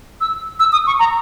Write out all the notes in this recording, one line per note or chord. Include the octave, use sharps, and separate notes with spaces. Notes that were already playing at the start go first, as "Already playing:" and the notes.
E6
E6
D#6
C#6
A#5